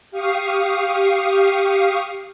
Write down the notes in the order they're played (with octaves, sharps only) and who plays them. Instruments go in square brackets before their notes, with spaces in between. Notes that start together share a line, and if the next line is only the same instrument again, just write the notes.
[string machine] G4 F5 C#6 D#6 C7